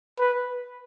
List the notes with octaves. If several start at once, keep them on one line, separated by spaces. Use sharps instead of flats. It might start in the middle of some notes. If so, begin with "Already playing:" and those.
B4